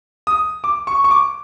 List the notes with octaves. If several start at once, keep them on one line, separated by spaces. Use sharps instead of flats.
D#6
D6
C#6
C#6
D6